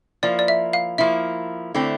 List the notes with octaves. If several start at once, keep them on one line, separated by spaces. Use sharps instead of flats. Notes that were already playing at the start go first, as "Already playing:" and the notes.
F3 A#3 E4 D5
D5
E5
F5
F3 A#3 E4 E5
D3 A3 C4 E4